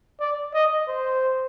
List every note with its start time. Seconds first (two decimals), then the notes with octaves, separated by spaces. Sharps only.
0.20 D5
0.54 D#5
0.88 C5